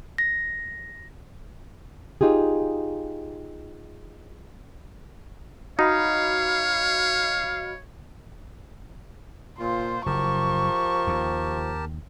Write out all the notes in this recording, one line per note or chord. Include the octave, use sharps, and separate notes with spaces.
A#6
D#4 F4 G4 G#4
D#4 F#4 C#5 D#5 F5 B5
A#2 F4 C5
F#1 F3 G4 A#4 A5 C#6
D#2